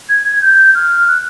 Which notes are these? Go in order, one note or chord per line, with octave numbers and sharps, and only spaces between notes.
G#6
G#6
G6
F6
F#6